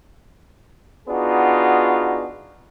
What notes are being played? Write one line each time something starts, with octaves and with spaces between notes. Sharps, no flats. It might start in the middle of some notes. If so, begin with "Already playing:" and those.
B3 D4 D#4 F4 F#4 G#4